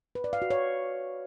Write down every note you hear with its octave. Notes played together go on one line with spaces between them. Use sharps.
B4
D5
F5
F#4
C#5